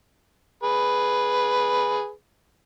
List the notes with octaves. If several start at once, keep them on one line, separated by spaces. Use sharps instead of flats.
G#4 B4